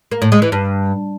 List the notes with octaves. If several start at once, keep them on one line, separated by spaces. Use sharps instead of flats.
A#3
A2
G#3
E3
G2